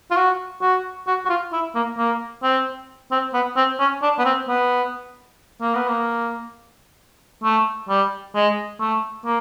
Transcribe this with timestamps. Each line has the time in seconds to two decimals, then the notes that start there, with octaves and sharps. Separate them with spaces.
0.11 F4
0.17 F#4
0.62 F#4
1.07 F#4
1.25 F#4
1.29 F4
1.53 E4
1.75 A#3
1.98 A#3
2.43 C4
3.11 C4
3.34 B3
3.56 C4
3.79 C#4
4.02 D4
4.19 B3
4.25 C4
4.48 B3
5.61 A#3
5.75 B3
5.88 A#3
7.44 A3
7.89 G3
8.35 G#3
8.80 A3
9.25 A#3